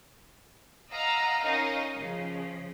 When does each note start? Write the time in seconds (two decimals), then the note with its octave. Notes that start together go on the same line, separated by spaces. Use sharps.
0.91 D#5 F5 F#5 A#5 E6 F6
1.39 C#4 D#4 A#4 D#5 F5
1.97 C#3 F3